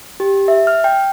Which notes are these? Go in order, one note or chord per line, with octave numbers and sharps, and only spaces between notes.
G4
E5
F6
G5